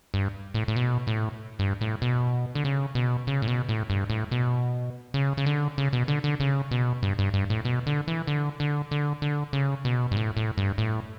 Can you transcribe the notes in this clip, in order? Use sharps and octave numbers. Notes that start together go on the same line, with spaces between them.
G2
A2
A2
B2
A2
G2
A2
B2
D3
C#3
B2
C#3
A2
B2
A2
G2
A2
B2
C#3
C#3
D3
C#3
B2
D3
D3
C#3
B2
G2
G2
G2
A2
B2
D3
E3
D3
D3
D3
D3
C#3
B2
G2
A2
A2
G2
A2